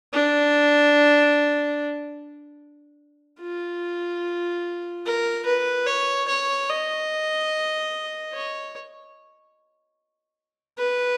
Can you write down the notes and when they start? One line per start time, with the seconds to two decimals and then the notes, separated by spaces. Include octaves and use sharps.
0.13 D4
3.41 F4
5.05 A#4
5.46 B4
5.87 C#5
6.28 C#5
6.70 D#5
8.33 C#5
10.79 B4